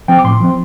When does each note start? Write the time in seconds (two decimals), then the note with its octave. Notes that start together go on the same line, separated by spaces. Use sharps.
0.08 F3 C4 G5
0.19 D6
0.24 A2 C6
0.40 F3 C4